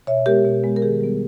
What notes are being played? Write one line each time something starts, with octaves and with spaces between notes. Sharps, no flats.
B2 C#5 E5
G#3 B3 G4 A#4
B2
G#3 B3
A#4
D#3 G#4
G3 B3